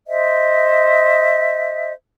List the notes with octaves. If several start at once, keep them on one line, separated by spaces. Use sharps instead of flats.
C5 D#5 E5